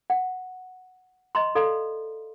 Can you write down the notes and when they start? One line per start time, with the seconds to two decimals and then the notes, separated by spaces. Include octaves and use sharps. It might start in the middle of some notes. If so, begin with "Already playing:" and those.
0.10 F#5
1.35 D#5 A#5 C6
1.55 A4 D5 F5 A#5 C6